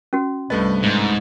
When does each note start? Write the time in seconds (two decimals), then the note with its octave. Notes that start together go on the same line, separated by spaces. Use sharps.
0.13 C#4 F#4
0.50 C2 G2 A3 B4 D#5
0.83 G#2